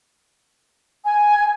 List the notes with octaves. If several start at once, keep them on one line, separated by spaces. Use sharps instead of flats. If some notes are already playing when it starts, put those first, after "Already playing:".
G#5